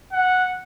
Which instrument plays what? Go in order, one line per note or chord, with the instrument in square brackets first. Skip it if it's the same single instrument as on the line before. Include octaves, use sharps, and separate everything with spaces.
[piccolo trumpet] F#5